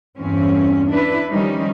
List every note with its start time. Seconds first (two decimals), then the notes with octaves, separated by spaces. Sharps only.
0.17 E2 G2 C4 C#4
0.90 D4 E4 B4
1.31 D#3 F3 G3 C#4 D#4